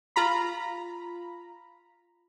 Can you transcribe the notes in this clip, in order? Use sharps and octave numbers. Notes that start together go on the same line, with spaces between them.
F4 A#5 B5